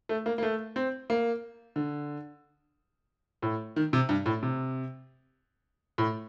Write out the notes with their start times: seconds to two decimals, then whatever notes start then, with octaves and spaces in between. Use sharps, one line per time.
0.09 A3
0.26 A#3
0.38 A#3
0.43 A3
0.76 C4
1.10 A#3
1.76 D3
3.43 A2
3.76 D#3
3.93 C3
4.09 G2
4.26 A2
4.43 C3
5.98 A2